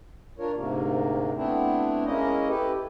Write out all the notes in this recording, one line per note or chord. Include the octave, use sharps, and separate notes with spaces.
D4 F4 A#4 C#5
D2 G#2 C3 A#3
A3 B3 C4 D4 E4
G#3 A#3 C#4 E4 D#5
E4 G4 A4 B4